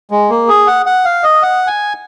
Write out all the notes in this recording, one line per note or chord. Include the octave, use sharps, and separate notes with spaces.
G#3
A#3
G#4
F#5
F#5
F5
D#5
F#5
G#5